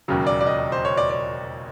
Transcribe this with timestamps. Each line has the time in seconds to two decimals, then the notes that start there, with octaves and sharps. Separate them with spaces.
0.08 E1 D#2 C#3 F#3
0.27 D5
0.41 D5
0.47 D#5
0.72 C5
0.85 C#5
0.97 D5
1.10 D5